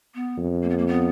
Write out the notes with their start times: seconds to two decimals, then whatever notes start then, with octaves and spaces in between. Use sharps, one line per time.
0.15 B3
0.38 F2
0.63 A#3
0.70 B3
0.78 A#3
0.87 B3